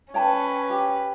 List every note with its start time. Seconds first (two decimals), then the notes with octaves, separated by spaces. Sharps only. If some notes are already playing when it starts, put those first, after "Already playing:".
0.14 C#4 B4 C#5 G5 A5
0.70 G4